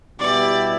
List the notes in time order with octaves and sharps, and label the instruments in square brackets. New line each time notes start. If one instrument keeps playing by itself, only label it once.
[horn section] B2 G3 B3 E4 G4 [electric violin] D5